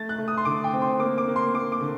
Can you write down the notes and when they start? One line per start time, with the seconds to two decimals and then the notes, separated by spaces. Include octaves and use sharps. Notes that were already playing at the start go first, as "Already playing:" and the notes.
Already playing: A3 A6
0.09 F#6
0.18 A3
0.28 D#6
0.37 C6
0.45 D3 D6
0.64 G5
0.73 C4
0.82 C6
1.00 A#3 D6
1.18 D6
1.28 A#3
1.36 C6
1.54 A#3 D6
1.72 D6
1.81 D3